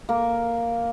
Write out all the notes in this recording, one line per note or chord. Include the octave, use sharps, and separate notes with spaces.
A#3